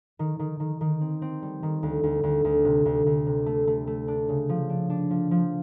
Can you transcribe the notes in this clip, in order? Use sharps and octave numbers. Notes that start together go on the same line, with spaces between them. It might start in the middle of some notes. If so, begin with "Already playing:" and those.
D#3
D#3
D#3
D#3
C4
C4
G3
D#3
D2
D2
D2
D2
C3
D2
D2
C3
A3
A3
A3
D4
C#3
F3
D4
D4
F3
F3